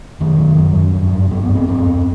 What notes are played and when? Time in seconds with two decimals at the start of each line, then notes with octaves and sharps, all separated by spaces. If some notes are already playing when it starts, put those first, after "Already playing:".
0.20 F#2 D#3
0.39 F#2
0.57 F#2 F#3
0.76 F#2
0.94 G2
1.12 G2
1.31 G2 B3
1.43 B3
1.49 G2
1.55 C4
1.68 F#2 C4
1.86 F#2